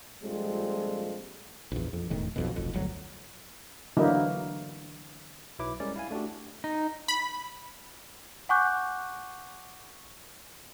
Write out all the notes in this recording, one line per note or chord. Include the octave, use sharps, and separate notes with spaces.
A#1 G3 G#3 C4 F4 A4
A#1 E2
F2
E1 A2 D#3
B1 F2 B2
F1 B1 F2
G1 D2 F#3
D3 E3 F#3 A#3 D#4 E4
B1 F#3 E4 B4 D6
G3 G#3 C#4 A#4 D5
E4 F5 G#5
A3 D4 F#4 G4
D#4
B5
F#5 G#5 C#6 D6 F#6 G6